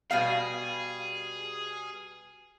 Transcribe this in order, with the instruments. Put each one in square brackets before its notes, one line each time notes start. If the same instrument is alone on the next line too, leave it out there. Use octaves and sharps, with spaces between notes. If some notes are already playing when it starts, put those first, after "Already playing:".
[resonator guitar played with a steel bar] B2 G3 F5 [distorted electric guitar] G#4